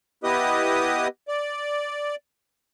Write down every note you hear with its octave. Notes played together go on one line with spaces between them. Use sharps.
B3 E4 G4 B4 D#5 D#6
D5